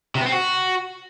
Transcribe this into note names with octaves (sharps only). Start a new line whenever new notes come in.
C3
B3
C4
F#4